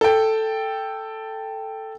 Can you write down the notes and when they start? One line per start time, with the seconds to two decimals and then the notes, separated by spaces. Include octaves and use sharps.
0.01 A4 G5